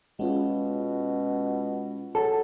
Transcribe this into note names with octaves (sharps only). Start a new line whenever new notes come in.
B2 G#3 C#4 F4
F#3 A4